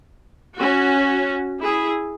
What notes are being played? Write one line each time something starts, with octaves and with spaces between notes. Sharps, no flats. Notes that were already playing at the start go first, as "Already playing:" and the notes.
C#4 F#4
E4 G#4